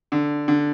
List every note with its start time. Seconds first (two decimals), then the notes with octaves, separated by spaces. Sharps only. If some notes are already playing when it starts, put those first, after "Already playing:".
0.12 D3
0.48 D3